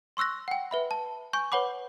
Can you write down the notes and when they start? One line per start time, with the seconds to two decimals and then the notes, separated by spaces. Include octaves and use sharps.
0.17 C6 C#6 E6 F#6 A#6
0.48 F#5 G5
0.71 B4 E5 B5
0.91 A5
1.33 G#5 C#6 G6
1.52 B4 C#5 F#5 B5 D6